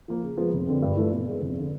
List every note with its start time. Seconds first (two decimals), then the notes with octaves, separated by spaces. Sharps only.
0.08 F3 A#3
0.23 C#3
0.37 F3 G#3 B3
0.53 F1
0.67 F2 D3
0.82 G2
0.97 E3 A3 D4 F4
1.12 B2
1.27 G#3 B3
1.42 F1
1.59 D3